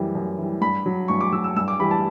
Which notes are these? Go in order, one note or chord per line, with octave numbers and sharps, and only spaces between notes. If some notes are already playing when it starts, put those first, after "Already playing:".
Already playing: F#2 E3 G3
F#2
E3 G3
G2 B5
F#3
G2 C#6
D6
F#3 E6
E6
G2 E6
D6
E3 G3 B5
A5